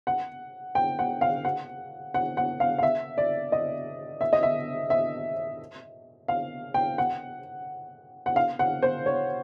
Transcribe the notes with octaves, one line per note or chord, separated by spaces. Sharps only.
F#5
G5
F#5
F5
F#5
F#5
F#5
F5
F5
E5
D5
D#5
E5
D#5
E5
E5
F5
G5
F#5
F#5
F5
F#5
C5
C#5